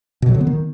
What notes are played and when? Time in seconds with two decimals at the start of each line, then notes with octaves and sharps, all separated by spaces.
0.22 B2
0.28 F#3
0.35 D3
0.41 B3
0.47 D#3